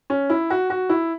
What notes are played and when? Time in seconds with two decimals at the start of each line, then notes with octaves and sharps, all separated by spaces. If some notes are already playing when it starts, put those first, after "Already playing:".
0.10 C#4
0.30 E4
0.50 F#4
0.70 F#4
0.89 E4